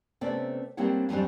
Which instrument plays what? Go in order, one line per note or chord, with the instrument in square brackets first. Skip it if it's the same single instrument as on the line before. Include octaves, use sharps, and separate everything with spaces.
[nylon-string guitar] C3 A3 B3 C#4 D5
G3 A#3 C4 D4 C#5 F#5
F2 G#2 F#3 G3 C4 D4